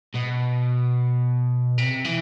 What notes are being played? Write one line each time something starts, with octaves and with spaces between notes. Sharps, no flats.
B2
C3
E3